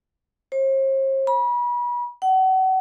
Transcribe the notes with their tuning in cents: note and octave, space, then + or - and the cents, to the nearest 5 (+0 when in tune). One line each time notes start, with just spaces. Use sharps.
C5 +45
B5 -35
F#5 +35